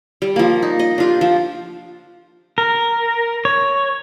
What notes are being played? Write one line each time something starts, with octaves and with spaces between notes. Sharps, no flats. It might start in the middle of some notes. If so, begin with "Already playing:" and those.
G3
F3 A#3
D#4
D#5
D4 F4 G4
F3
A#4
C#5